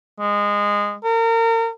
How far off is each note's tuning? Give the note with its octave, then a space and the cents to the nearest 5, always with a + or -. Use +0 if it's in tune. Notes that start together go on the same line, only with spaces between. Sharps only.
G#3 -20
A#4 -35